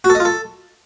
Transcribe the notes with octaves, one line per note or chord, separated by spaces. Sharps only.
F#4
A4
D#5
F4
A4